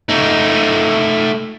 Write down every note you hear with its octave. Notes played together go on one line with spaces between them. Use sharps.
A3 D#4